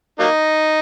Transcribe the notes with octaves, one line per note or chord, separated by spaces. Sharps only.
F#3 A#3 D#4